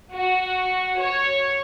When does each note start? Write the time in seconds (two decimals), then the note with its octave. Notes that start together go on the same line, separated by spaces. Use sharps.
0.13 F#4
1.00 C#5